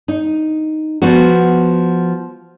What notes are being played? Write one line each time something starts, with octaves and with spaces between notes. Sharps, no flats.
D#4
F3 B3 F#4